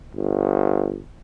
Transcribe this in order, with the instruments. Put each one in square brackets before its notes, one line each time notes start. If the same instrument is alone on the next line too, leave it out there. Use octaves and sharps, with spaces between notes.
[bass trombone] G1